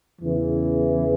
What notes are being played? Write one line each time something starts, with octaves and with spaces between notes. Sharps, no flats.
E2 C#3 E3